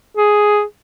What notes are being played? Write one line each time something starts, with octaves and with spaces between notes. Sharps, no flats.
G#4